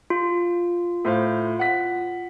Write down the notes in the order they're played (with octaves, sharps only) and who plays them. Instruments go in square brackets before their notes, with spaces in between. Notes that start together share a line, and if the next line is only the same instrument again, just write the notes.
[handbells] F4
[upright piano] A2 C5 F5
F#5 B6